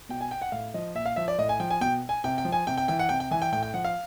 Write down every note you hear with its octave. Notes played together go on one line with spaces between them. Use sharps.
B2 G5
G#5
G5
F#5
A2 F5
F3 D#5
A#2 E5
F5
F3 E5
D5
A2 D#5
G#5
F3 G5
G#5
B2 G5
G#5
C3 G5
G5
F3
G#5
C3 G5
G5
E3 G5
F#5
C3 G5
G5
E3 G#5
G5
A2 G5
G5
F3 F#5
F5